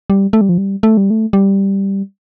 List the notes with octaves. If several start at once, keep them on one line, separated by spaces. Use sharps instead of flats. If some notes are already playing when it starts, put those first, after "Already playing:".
G3
A3
G3
F3
G3
A3
G3
A3
G3